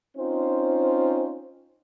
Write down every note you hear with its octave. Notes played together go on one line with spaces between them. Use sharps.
C4 C#4 D#4 F4 C5